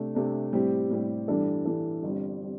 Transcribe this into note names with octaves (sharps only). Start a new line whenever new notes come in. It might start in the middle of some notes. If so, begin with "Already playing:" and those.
Already playing: C3 A3 D4
C3 A3 D4
A2 G3 C4 G4
A2 G3 C4 G4
G2 E3 G3 D4 A4
G2 E3 G3 D4 A4
G1 G2 G3 C4
G3 C4